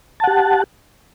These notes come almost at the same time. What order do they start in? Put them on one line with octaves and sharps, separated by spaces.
A5 F#5 G4